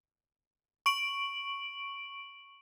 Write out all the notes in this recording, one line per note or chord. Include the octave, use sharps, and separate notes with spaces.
C#6 D7 F#7